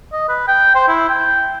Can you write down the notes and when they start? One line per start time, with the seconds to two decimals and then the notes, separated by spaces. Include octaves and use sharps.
0.12 D#5
0.28 B4
0.48 G5
0.75 C5
0.88 E4
1.09 G5